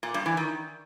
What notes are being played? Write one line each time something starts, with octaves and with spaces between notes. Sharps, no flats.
A#2
G2
E3
D#3